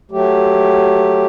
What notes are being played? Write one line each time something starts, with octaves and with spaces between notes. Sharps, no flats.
F#3 A3 G4